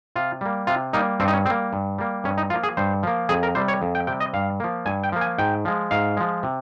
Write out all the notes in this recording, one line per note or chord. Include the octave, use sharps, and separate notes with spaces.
C3 F4
G3 A#3
C3 F4
G3 A#3 D#4
G2 C4
D#4
C#4
G3 A#3 C4
G2
G3 A#3
G2 C#4
D#4
F3 A#3 F4
G#4
G2 C5
F3 A#3
F2 G#4
A#4
C3 G3 C5
C#5
F2
G5
C3 G3 G5
D#5
G2 F5
F3 A#3
G2 G#5
G5
F3 A#3
G#5
G#2 G5
F3 G#3
G#2 F5
F3 G#3
C3